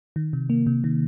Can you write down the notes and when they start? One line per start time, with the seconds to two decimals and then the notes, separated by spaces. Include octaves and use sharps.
0.16 D#3
0.33 C3
0.50 A#3
0.67 C3
0.84 D#3